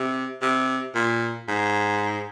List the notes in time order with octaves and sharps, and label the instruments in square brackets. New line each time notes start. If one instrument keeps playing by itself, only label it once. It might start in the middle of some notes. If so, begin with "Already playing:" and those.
Already playing: [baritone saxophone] C3
C3
A#2
G#2